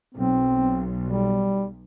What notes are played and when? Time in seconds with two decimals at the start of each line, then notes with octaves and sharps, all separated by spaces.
0.15 B1 C4
1.05 G3